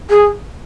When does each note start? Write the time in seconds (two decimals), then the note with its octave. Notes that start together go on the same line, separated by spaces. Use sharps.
0.10 G#4